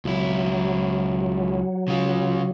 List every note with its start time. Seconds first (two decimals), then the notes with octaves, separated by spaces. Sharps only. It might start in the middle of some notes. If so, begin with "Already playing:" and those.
0.05 C#2 F#3 E4
1.88 C#3 F4